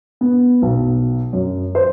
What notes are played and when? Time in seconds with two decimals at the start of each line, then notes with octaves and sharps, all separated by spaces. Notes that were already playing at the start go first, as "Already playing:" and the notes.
0.21 B3
0.62 B1
1.33 F#2
1.75 C5